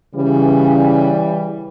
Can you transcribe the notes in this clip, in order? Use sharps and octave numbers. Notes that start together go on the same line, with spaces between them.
C#3 E3 G3